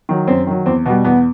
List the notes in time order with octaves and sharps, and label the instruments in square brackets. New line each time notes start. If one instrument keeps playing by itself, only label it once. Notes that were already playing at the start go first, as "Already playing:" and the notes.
[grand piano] D#3 F#3
F#2 C4
D#3 F#3
E2 C4
B2 G3 B3
E2 B3